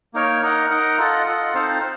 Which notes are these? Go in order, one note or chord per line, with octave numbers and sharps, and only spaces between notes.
A#3 D#4 A#4 C#5
D#4 A#4 D#5 F#5
D#4 A#4 D#5 F#5
F4 A4 D#5 F#5
F4 A4 D#5 F#5
C4 D#4 A4 C5 F5